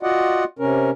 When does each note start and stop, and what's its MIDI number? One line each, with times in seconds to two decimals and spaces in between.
0.03 0.44 65
0.03 0.44 66
0.03 0.44 74
0.03 0.44 75
0.03 0.44 78
0.59 0.91 48
0.59 0.91 61
0.59 0.91 70